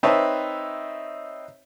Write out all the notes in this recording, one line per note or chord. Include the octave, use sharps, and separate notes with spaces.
C4 D#4 B4 C#5 E5 A5